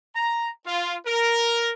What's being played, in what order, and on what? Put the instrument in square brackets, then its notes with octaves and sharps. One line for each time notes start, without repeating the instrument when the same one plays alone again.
[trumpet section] A#5
F4
A#4